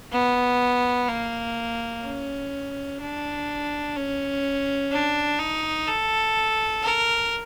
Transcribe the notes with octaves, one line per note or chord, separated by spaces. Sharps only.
B3
A#3
C#4
D4
C#4
D4
D#4
A4
A#4